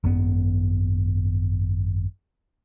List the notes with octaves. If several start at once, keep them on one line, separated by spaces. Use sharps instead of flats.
G#1 F#2 B3